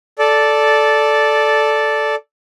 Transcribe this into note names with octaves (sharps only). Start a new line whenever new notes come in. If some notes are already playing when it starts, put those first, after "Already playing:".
A4 D5